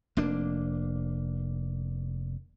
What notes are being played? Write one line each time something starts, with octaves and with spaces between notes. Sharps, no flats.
F1 A#3 D4